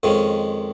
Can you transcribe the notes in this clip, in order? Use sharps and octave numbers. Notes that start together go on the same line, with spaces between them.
F2 D#3 G#3 C#4